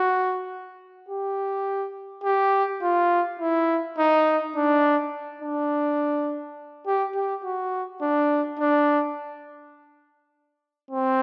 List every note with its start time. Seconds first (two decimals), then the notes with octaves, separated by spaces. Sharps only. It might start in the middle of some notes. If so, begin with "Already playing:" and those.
Already playing: F#4
1.09 G4
2.24 G4
2.82 F4
3.39 E4
3.98 D#4
4.56 D4
5.42 D4
6.87 G4
7.15 G4
7.44 F#4
8.02 D4
8.60 D4
10.91 C4